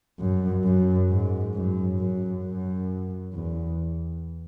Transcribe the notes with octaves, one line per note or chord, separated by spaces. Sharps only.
F#2
F#2
G#2
F#2
F#2
F#2
E2